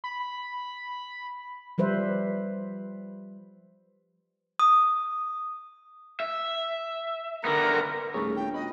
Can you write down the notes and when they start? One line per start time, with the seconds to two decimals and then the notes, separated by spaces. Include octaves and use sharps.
0.04 B5
1.78 F3 G3 B4 C5 E5
4.59 D#6
6.20 E5
7.45 D3 B3 A#4
8.14 D#1 A3 G#4 C#5 C#6
8.36 D4 F4 G5
8.54 B2 B4 D#5